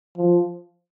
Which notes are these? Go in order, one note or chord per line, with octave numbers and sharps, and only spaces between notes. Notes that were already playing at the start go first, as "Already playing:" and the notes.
F3